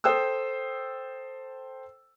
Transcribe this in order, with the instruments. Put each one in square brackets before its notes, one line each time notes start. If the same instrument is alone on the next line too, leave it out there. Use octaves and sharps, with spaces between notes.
[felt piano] A4 C5 G5 D#6 E6